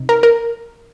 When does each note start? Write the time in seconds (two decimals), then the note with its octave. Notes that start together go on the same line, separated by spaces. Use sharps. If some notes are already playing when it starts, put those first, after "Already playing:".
Already playing: C3 D#4
0.09 A#4
0.23 A#4